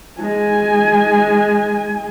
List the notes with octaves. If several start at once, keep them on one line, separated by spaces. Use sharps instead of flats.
G#3 G#5